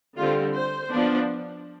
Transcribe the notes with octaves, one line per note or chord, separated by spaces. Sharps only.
D3 G3 C4 F4
C5
F3 B3 D4